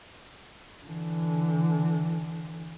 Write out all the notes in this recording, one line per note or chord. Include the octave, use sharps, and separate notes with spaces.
D3 E3